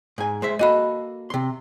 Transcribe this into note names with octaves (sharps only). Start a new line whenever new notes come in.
G#2 G#5
G#3 C5 E5
A#3 F#4 A4 D#5 B5
C3 C6